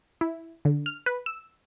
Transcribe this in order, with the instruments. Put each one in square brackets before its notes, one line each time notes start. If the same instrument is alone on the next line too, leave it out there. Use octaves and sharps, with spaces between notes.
[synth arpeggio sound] E4
D3
F6
B4
E6